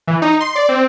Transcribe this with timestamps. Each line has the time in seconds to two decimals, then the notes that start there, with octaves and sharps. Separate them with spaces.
0.07 E3
0.22 D#4
0.40 C6
0.55 D5
0.69 C4